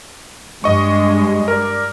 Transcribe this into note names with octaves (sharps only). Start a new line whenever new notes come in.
G2 G#3 D#5 C#6
A#4 D5